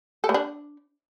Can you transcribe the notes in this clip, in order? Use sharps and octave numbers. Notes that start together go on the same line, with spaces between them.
A4
A3
D4